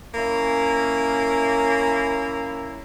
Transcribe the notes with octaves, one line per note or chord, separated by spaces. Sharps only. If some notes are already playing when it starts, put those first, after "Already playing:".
A#3 C#4 E4